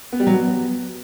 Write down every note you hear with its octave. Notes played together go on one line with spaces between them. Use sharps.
B3
G3
F#3
B3